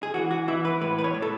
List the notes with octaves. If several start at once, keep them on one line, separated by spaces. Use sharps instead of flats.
G#4
E3 F#4
F#4
E3 E4
B4
A2 B4
B4
C#5
A2
A4